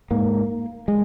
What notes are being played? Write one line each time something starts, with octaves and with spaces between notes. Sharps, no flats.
G#2 A#3
G#3